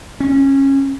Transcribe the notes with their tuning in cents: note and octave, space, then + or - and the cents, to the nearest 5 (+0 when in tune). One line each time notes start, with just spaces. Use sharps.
C#4 -20